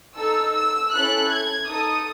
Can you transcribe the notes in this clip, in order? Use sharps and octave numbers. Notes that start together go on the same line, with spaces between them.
D#4 A4 E6
E6
C#4 E4 A4 F#6
G#6
D#4 A4 D#6